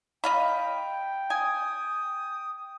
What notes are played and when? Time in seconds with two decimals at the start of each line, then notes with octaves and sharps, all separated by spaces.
0.24 D#5 F5 G5 B5
1.30 G#5 D#6